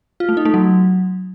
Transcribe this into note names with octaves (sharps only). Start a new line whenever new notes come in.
F4
A3
D#4
A3
F#3